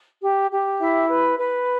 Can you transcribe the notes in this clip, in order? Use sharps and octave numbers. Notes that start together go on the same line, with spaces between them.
G4
G4
E4 E5
B4
B4